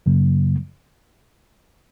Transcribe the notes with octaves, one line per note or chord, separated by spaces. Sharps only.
F#2 C#3 F#3 A#3